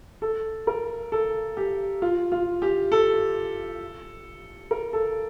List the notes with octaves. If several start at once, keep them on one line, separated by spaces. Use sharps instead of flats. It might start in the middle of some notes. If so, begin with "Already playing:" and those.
A4
A#4
A4
G4
F4
F4
G4
A4
A#4
A4